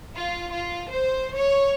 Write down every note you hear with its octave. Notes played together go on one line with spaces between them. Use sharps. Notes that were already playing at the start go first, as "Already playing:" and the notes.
F4
F4
C5
C#5